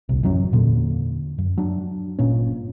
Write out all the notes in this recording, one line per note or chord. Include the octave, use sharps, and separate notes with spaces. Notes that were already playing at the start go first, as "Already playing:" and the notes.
D#1 C2
A1 F#2 F#3 C#4
E2 A#2 D3
F#2
F#3 D4
G1 A#2 C#4